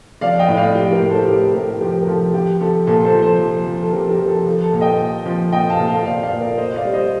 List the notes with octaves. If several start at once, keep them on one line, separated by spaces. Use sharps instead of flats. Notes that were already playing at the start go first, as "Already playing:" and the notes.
F3 D5 F5
D#5 G5
A2
D5 F5
F3 G4
G4 A#4
A2
A4 C5
A2 G4 A#4
A2 G4 A#4
F3 G4 A#4
A#4
F3 A4
F3 G4
F3 A4
A#2 A4
A4 C5
F3
A4 C5
F3
F3
A4
F3 G4 A#4
G4 A#4
F3
A4
F3 A4
A4
A#2
D#5 G5
A#2
F3
A#2 D#5 G5
F5 A5
A#2
F5 A5
A#2 D5 F5
D5 F5
A#2
A#4 D5
A#2 C5 D#5
D5 F5
G3
C5 D#5